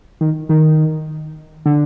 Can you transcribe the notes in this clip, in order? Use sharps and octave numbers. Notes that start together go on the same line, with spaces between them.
D#3
D#3
D3